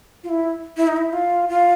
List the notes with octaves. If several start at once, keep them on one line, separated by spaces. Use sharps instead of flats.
F4
E4
E4
D#4
E4
F4
F4